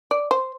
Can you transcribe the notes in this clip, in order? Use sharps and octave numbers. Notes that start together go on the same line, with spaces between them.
D5
C5